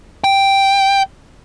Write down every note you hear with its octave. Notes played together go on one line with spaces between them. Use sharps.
G5